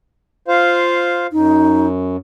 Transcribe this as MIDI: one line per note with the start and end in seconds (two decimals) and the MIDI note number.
0.48 1.27 65
0.48 1.27 72
0.48 1.27 77
1.32 2.17 42
1.32 1.87 63